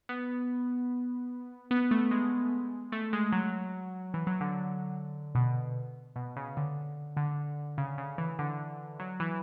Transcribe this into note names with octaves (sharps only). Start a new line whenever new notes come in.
B3
B3
A3
G#3
A3
G#3
F#3
E3
F#3
D3
B2
B2
C#3
D3
D3
C#3
C#3
E3
D3
F#3
E3